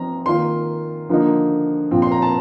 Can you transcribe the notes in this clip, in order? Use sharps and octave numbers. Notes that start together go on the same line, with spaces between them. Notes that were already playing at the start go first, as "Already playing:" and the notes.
Already playing: F3 C4 D#4 A#5
D#3 A#3 F4 C6
D3 F3 A#3 D#4
A#2 F3 C4
C6
A#5
A5